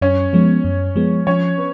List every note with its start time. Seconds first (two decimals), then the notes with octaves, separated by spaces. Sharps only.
0.01 F#2 C#4 C#5
0.33 F3 G#3 B3
0.64 F#2
0.96 F3 G#3 B3
1.27 F3 C#4 C#5
1.58 B3